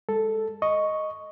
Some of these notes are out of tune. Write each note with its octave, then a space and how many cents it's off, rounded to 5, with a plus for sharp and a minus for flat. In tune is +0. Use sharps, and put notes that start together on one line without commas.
G#3 -30 A4 +0
D#5 +0 C#6 +0